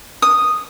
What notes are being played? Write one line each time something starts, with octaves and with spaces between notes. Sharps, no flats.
D#6